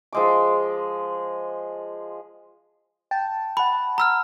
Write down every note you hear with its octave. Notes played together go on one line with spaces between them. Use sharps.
F3 G#3 D6
G5 A5
F#5 A5 B5
A#5 E6 F6